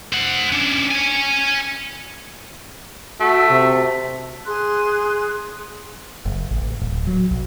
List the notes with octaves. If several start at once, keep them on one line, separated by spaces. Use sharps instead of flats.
C5 F#5
C#4 D4
C#5 G#5
A3 F#4
C3
G#4 C6 F#6
F#1
A1
D1
F#3
B1